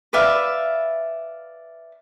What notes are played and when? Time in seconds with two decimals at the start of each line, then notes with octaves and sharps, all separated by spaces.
0.13 B4 D5 E5 F5